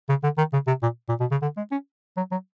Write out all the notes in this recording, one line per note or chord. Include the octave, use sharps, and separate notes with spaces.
C#3
D3
D#3
C#3
C3
A#2
A#2
B2
C#3
D3
G#3
C#4
F#3
F#3